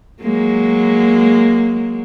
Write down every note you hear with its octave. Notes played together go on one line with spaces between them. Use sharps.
F#3 G#3 A#3